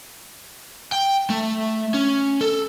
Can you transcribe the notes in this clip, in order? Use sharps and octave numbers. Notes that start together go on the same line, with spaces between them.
G5
A3
C#4
A4